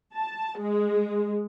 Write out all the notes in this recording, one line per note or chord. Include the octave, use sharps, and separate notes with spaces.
A5
G#3